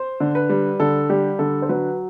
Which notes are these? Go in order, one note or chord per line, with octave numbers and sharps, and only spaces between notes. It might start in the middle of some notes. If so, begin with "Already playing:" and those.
Already playing: C5
D3
B4
G3
D3 A4
G3 G4
D3 A4
C5
F#3 B4